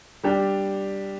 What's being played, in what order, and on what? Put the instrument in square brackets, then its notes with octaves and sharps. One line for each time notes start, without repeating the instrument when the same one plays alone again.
[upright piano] G3 D4 G4